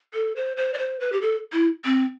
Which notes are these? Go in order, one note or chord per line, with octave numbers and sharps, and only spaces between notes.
A4
C5
C5
D5
C5
B4
G4
A4
E4
C4